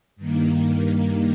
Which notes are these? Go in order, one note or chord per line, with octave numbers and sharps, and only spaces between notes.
G2 D#3 A#3